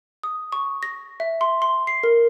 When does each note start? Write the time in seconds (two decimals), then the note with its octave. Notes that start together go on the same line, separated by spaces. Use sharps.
0.23 D#6
0.52 C#6
0.83 A#6
1.20 E5
1.41 C6
1.62 C6
1.87 C7
2.03 A#4